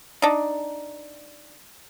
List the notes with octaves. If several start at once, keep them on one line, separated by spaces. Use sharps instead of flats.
D4 D#4